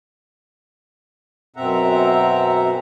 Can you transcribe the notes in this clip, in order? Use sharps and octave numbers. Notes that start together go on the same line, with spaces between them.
F#2 B2 C4 E5 F#5 A#5